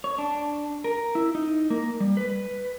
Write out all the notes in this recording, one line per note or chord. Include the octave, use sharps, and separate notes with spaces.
C#5
D4
A#4
E4
D#4
A#3
G3
B4